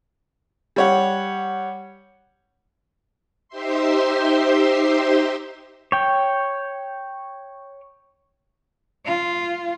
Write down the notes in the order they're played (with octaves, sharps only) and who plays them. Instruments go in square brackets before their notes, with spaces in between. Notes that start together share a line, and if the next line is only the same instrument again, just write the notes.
[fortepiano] G3 C#5 F#5
[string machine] D#4 G4 C5 E5 C6
[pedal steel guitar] C#5 G5
[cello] F4